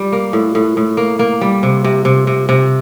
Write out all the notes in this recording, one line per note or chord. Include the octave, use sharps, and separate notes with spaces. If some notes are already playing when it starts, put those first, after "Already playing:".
Already playing: G3
A#3
A2
A2
A2
A#3
A#3
G3
C3
C3
C3
C3
C3